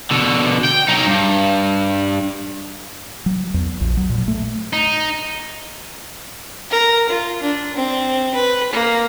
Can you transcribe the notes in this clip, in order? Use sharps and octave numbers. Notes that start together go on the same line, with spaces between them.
B2 D3
G5
F#3 D#4
G2
F#3
E2
A#1
F#3
A#2
A3
D#4
A#4
F4
D4
C4
B4
A#3